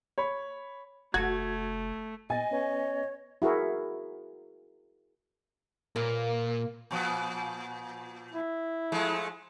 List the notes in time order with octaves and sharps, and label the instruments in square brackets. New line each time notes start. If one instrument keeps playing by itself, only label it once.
[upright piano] C#5 B5
[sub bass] F1 [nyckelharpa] A3 [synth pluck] F#4 [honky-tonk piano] G#6
[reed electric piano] A#2 B3 A6 [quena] D#5 [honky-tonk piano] G#5
[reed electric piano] B3 C#4 B4 [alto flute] C#5
[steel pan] E4 F#4 G#4 A#4
[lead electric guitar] A#2 [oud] A#3 B4
[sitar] A#2 F3 B3
[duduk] E4
[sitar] F3 G#3 A3